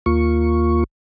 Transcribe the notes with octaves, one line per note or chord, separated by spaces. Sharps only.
D#2 A#3 F4 C#6